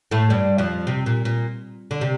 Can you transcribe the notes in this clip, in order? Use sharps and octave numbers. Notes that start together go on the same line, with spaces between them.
A2 A3
G2 G3
F2 F3
C3
A#2
A#2
D3
C3